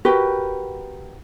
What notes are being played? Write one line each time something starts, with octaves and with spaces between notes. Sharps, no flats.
F#4 G4 A#4 B4